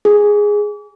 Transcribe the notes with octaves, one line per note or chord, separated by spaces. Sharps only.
G#4